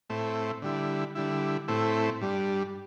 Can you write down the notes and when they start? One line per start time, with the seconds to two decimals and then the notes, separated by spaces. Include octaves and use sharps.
0.10 A2 A3 C4 E4
0.62 D3 G3 E4
1.15 D3 G3 E4
1.68 A2 A3 C4 E4
2.21 G2 G3 D4